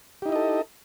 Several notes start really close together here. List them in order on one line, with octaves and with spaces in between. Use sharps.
G4 D#4 E4 D#5 A4